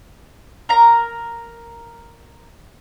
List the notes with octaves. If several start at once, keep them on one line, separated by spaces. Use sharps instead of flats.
A#4 A#5